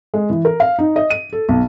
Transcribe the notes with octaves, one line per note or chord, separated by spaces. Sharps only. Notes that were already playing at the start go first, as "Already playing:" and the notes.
G#3
E3
A#4
F5
D#4
D#5
D#7
A4
B1